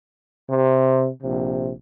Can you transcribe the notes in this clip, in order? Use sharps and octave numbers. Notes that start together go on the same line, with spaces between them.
C3
A#1 C3